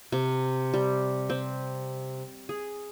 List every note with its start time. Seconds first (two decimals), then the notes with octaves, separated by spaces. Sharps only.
0.12 C3
0.74 G3
1.30 C4
2.49 G#4